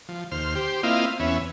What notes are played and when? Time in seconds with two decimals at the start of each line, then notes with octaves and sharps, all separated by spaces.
0.09 F3
0.31 D#2 C5 F6
0.55 G4 C5
0.83 A#3 C4 E4 F4 D#5 F5
1.20 E2 B3 C#4 E5